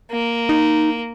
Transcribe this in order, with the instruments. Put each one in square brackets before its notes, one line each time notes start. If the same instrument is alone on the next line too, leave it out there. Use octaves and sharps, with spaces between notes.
[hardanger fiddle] A#3
[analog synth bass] D#4